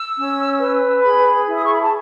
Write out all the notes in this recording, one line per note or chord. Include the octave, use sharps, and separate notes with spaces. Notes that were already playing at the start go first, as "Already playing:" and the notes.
Already playing: E6
C#4
B4
G#4 B5
E4
D#6
C#6
B5
A5